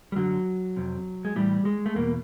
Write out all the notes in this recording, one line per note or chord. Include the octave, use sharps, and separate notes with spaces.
G3
F#2 D3 F#3
F2 C3
G#3
A2 E3 G3
G#3
A3
E2 B2 A#3